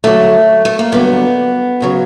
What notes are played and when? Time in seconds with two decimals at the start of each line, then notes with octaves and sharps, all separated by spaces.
0.04 G2 D3 F#3 A3
0.65 A3
0.79 A#3
0.92 G2 D3 F#3 B3
1.80 D2 C#3 F#3